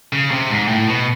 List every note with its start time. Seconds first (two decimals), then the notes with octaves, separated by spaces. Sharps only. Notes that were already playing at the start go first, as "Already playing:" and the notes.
0.13 C#3
0.31 C3
0.50 G#2
0.68 A2
0.87 B2